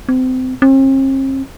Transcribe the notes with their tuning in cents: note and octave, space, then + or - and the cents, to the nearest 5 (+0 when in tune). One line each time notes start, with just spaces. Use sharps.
C4 -30
C4 +45